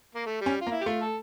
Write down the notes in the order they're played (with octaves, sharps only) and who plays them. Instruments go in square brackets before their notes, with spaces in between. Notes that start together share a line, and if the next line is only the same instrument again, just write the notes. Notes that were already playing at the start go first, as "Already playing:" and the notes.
[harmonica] A#3
A3
G3
[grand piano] C#4
[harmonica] F4
[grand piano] A#3
[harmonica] E4
G4
[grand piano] A3 [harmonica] F4
[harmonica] A4